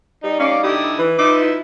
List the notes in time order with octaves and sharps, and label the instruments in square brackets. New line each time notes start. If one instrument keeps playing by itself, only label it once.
[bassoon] G3 [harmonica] D#4
[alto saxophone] C#4 [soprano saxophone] D#4 [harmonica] F5 D6
[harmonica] D3 E4 D#6 [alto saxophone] G4
[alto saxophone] E3 [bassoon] B4
[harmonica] F3 E5 [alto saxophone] D#4 [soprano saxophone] D6
[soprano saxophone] E4